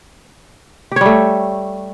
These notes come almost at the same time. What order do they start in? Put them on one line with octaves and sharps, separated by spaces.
G4 C#5 G3 A3